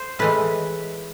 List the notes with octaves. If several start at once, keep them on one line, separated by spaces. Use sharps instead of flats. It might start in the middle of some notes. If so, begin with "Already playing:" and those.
Already playing: C5
A2 E3 G#3 B4